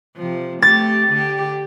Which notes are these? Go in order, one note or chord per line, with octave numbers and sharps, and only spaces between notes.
C3 F3
A3 G4 A6
D3 G4